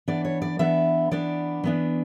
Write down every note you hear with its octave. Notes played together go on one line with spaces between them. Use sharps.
E3 B3 D4 D5
C#5
D5
E3 B3 D4 E5
E3 B3 D4 D5
E3 B3 D4